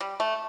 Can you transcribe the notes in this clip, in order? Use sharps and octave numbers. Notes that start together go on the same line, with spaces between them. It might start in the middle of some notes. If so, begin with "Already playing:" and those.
G3
A3